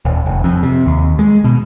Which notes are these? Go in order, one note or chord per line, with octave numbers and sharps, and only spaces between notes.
D#1
F1
F2
C3
D#2
G#3
B2